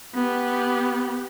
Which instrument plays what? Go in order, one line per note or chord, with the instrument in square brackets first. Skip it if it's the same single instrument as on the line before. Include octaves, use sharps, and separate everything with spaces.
[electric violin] B3 G4